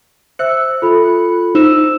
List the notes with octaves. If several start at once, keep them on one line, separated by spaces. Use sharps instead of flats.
C5 E5 E6 F#6 C#7
F4 A4 B5
D#4 C5 E6 E7